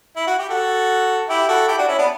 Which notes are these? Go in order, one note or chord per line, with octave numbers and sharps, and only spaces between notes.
E4
F#4
G4
F#4 A4
E4 G4
F#4 A4
E4 G4
D4 F#4
C#4 E4
B3 D4